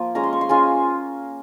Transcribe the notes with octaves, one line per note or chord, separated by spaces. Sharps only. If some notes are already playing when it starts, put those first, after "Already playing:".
Already playing: F3 A#3
G#3 C#4 F4 A#5
C6
C#6
C6
G#3 C#4 F4 G#5